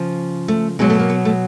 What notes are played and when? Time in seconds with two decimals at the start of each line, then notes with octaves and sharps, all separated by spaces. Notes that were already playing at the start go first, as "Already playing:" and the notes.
Already playing: C#3 F3
0.48 A3
0.79 B2 F#3 G#3
0.90 A3
0.99 A#3
1.10 B3
1.25 A3